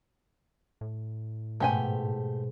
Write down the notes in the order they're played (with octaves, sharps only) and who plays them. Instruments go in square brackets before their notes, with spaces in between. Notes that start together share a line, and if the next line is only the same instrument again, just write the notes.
[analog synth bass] A2
[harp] G#2 B2 G#3 [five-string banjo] A3 G4 G#5